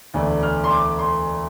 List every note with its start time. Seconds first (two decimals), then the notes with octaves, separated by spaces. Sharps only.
0.14 E1 D2 D3 A3 D4
0.43 F6
0.64 C6
0.70 D6
0.99 C6